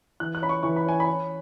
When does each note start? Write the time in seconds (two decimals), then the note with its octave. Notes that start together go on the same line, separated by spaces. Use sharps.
0.20 E3 F#6
0.35 F#6
0.42 C#4 B5
0.49 C#6
0.63 E3 C#6
0.76 B5
0.86 C#4 G#5
1.00 B5
1.07 C#4